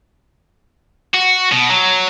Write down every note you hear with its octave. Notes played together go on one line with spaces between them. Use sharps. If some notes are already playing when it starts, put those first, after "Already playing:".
F#4
B2
F#3